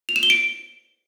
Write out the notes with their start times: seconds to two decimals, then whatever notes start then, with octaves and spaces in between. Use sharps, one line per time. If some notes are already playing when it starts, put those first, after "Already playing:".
0.09 F7
0.16 E7
0.23 G7
0.30 D7